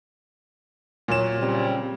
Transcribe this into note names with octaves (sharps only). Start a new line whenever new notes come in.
A#2 F#3 E7
C#3 G3 C4